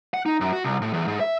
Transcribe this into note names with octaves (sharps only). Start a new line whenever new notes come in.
F#5
D#4
F#2
F#4
C2
A2
E2
G#2
E5